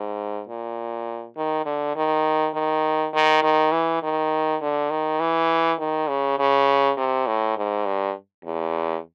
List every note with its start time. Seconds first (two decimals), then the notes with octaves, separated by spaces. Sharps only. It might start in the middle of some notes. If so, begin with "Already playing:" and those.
Already playing: G#2
0.49 A#2
1.37 D#3
1.66 D3
1.96 D#3
2.55 D#3
3.14 D#3
3.43 D#3
3.72 E3
4.03 D#3
4.62 D3
4.91 D#3
5.20 E3
5.79 D#3
6.09 C#3
6.39 C#3
6.97 C3
7.27 A2
7.57 G#2
7.86 G2
8.45 E2